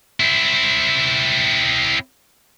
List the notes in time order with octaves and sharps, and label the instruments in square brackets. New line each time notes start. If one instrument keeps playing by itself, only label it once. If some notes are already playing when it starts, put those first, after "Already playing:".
[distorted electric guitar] C4 E4